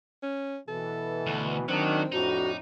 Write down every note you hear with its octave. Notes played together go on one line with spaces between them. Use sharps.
C#4
B2 E3 A4
D2
D#3 F#3 C4 D4
F2 A2 D4 D#4 F#4